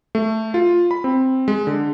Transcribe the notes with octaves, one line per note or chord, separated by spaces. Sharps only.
A3
F4
B5
C4
G#3
D3